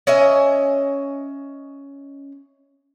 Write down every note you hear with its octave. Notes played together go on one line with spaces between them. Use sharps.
C#4 D#5 E5 G#5